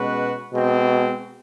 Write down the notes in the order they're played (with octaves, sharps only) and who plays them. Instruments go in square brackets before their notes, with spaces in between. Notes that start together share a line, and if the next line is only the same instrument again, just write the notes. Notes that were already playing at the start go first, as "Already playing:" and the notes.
Already playing: [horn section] B2 G#3 C#4 F#4 B4
B2 G#3 C4